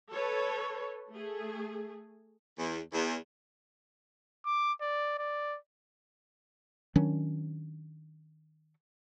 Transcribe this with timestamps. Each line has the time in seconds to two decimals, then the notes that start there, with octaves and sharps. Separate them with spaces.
0.12 A4 B4 C#5
1.09 A3 G#4
2.57 E2
2.93 E2
4.46 D6
4.81 D5
5.19 D5
6.96 D#3 F#3 C#4 D4